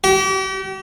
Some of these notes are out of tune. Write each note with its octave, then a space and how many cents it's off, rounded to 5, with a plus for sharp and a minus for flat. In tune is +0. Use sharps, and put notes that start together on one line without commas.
G4 -40